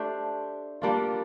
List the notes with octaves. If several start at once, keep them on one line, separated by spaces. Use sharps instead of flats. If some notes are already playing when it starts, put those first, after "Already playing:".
Already playing: A3 D4 G4 C5
G3 A#3 D4 F4